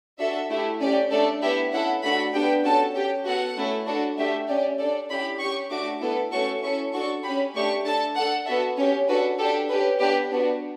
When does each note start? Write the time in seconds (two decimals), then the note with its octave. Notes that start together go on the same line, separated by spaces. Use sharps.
0.19 D4 F#4 A4 E5
0.50 A3 E4 G4
0.80 C#4 G4 D5
1.11 A3 D4 A4 D5
1.42 B3 E4 G4 E5
1.72 C#4 E4 A4 F#5
2.03 A3 D4 F#4 A4 B5
2.34 B3 D4 G4 G5
2.64 C#4 F#4 A4 A5
2.95 C#4 G4 G5
3.25 B3 F#4 A4 F#5
3.57 A3 C#4 E4 A4
3.87 D4 F#4 A4
4.18 A3 D4 G4 E5
4.48 C#4 G4 D5
4.79 D4 A4 D5
5.09 C#4 E4 G4 B5
5.40 C#4 G4 C#6
5.70 A3 D4 F#4 D6
6.02 B3 E4 A4
6.32 A3 C#4 F#4 A4 C#6
6.62 C#4 E4 A4 C#6
6.94 D4 F#4 A4 C#6
7.24 G4 B5
7.29 C#4
7.55 A3 D4 G4 C#6
7.86 D4 A4 A5
8.16 D4 A4 F#5
8.46 B3 F#4 A4 E5
8.77 C#4 G4 C#5
9.08 D4 F#4 A4 B4
9.39 G4 A4
9.43 D4
9.69 C#4 G4 B4
9.99 B3 D4 G4 B4
10.31 B3 D4 F#4